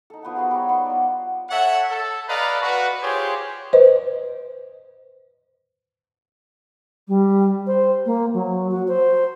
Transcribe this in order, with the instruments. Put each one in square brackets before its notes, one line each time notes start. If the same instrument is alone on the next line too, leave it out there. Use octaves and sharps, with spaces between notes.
[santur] D#4 A4
F3 B3 B4 F#5
B3 F#4 G#4 F5
G3 F#4 A#4 C#5
B3 D#4 C5 C#6
F4 D5
[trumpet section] A4 C#5 E5 F#5
A4
A4 B4 D5 D#5 F5 A#5
F#4 B4
F4 G4 G#4 C5 C#5
[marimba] B4 C5 D#5
[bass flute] G3
C5
A#3
F#3
F#4
C5